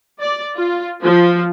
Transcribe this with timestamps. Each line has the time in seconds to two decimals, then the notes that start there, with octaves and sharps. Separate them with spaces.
0.21 D5
0.56 F4
1.02 F3